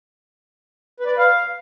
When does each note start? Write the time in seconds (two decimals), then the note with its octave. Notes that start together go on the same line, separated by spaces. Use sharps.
1.00 B4
1.06 D5
1.12 B4
1.18 F5